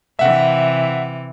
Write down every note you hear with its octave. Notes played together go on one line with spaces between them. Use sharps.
C3 E3 E5 F#5